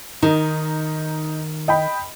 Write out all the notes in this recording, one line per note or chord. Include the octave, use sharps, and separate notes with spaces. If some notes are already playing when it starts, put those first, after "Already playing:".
D#3 D#4
D#5 G5 B5